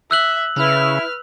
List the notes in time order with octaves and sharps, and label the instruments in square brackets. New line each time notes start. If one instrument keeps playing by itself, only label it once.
[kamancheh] E5 [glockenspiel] E6 F#6 F#7
[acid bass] C#3 [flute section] E4 [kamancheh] B4 F6